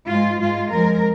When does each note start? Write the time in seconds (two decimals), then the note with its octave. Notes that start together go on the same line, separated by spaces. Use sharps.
0.09 G#2 G#3 F4
0.41 G#2 G#3 F4
0.73 F2 F3 G#3 A#4